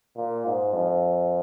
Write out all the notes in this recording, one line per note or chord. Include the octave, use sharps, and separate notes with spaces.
A#2
G#2
F2